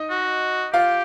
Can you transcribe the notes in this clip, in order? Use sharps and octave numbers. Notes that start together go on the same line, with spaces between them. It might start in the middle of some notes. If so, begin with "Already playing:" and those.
Already playing: D#4 D#5
F#4
F4 G4 F5